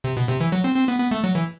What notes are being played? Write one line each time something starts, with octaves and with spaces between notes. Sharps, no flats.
C3
B2
C3
E3
F#3
C4
C4
B3
B3
A3
F#3
E3